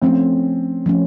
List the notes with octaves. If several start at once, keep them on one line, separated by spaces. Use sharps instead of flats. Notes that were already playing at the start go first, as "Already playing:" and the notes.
F3 A3 C4 C#4
F3 A3 C#4